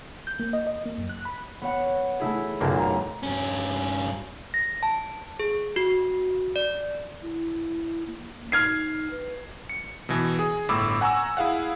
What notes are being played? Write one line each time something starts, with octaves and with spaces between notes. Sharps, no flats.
G6
A#3
D#5
D#5
A#3
F#2
F#6
B5
B3 C#5 F#5
A3 E4 G#4
F#1 B1 A#2 A#3 A5
A#5
G2 C#4
A#6
A5
G#4
F#4
D5
E4
A#3
D#4 F6 G#6 C7
B4
C#7
B2 E3 B3
G#4
G1 A2 B5 D6 E6
F#5 G#5 A#5 C#6 E6
E4 G#4 F5 F#5